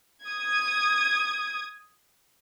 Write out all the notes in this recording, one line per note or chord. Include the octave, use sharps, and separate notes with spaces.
D#6 G#6